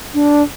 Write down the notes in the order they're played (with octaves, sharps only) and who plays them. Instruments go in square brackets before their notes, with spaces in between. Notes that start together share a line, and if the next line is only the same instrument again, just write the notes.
[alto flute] D4